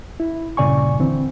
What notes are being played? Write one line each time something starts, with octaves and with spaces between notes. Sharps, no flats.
E4
G2 A#2 C#3 D5 G#5 C#6
D3 E3 C4